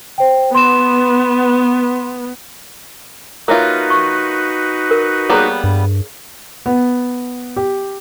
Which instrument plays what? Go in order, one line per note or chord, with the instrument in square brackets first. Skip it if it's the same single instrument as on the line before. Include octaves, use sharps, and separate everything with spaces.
[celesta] C5 G5
[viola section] B3 [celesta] C6 E7
[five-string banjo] A#3 F4 [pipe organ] D#4 F#4 B4 [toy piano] A#4 C#5 E5
[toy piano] C#6
A#4
[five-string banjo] G3 A#3 B3 [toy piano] G#4 C#5
[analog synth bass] G2
[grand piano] B3
G4